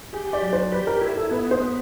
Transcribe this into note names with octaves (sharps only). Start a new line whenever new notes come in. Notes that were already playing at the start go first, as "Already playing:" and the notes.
G4 G#4
D5
F#3
C5
G4 B4
A#4
E4 A#4
A4
B3 B4
C5
B3